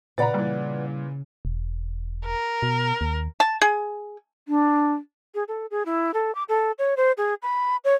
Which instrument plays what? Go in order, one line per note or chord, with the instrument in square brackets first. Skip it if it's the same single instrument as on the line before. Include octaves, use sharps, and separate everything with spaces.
[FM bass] A#2 [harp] C#3 [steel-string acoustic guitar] B4 D5 F#5 [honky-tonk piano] A#5 B5 A6
[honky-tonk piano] A#2 E3 [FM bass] G3
[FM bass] E1
[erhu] A#4
[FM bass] B2
D#2
[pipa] A5
G#4
[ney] D4
[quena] G#4
A4
G#4
E4
A4
D6
A4
C#5
C5
G#4
B5
C#5